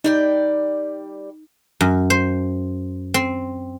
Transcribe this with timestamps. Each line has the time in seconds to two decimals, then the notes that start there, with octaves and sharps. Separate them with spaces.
0.04 G3 D#4 D5 G5
1.81 F#2
2.10 C5
3.14 C4